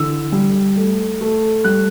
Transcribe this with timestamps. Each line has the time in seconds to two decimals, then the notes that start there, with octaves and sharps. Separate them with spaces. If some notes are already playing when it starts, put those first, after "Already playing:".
Already playing: D3 E3 E6
0.32 G3
0.76 A3
1.21 A3
1.64 G3 F#6